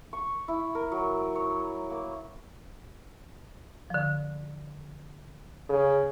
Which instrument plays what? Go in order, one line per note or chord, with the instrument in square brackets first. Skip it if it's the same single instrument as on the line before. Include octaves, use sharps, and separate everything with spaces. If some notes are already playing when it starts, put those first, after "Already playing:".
[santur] C#6
E4
A#4
F#3
C#5
A#3
[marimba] D3 F3
[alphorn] C#3